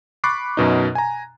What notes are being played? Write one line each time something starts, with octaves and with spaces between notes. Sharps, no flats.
B5 C#6 D6 F#6 A6 C7
F#2 B2 D#4
G#5 A#5